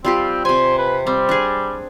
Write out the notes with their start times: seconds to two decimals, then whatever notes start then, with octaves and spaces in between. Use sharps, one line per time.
0.05 G3 C4 F4 G4
0.45 C3 C5 G#5
0.78 B4
1.07 G3 C4
1.29 D4 G#4